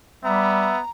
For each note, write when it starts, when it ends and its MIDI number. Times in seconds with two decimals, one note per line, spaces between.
0.24 0.73 55
0.24 0.81 59
0.24 0.80 76
0.24 0.90 82